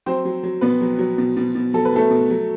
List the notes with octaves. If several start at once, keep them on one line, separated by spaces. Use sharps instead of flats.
F#3 C4 C5
F#3
F#3
B2 B3 B4
F#3
F#3
B2
B2
B2
F#3 A4
B4
F#3 A3 A4
B2
F#3